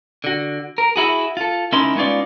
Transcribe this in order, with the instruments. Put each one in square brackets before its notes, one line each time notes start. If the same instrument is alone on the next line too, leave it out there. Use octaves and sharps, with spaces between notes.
[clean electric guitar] D3 F#4
A#4
E4 F#4 G#4
F4 A4
C#2 C#4 D#4 E4 A#4 C6
G#3 B3 C#4 D#4 F4 D5